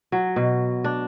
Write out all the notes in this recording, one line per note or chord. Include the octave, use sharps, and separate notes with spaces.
F#3
B2
D4